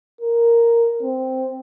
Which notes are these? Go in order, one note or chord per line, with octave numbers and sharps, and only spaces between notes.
A#4
C4